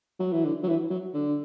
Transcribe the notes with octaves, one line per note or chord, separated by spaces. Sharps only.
F#3
E3
D3
F#3
E3
F#3
D3